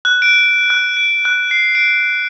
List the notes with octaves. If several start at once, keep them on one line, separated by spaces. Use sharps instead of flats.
F#6
D7
F#6
D7
F#6
C7
D7